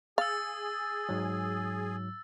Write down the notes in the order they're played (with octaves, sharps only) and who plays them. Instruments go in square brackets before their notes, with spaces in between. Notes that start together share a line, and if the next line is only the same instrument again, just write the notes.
[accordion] G#4 [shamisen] F5 [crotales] E6 A6
[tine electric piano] G#2 F#3